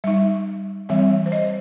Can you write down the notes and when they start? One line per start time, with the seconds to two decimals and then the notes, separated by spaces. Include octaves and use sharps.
0.04 G3 D#4 E5
0.89 E3 G3 C4 E5
1.26 C5
1.32 D#5